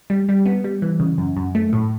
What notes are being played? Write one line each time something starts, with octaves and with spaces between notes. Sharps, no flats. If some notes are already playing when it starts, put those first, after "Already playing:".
G3
G3
B3
G3
E3
C#3
F#2
F#2
A3
A2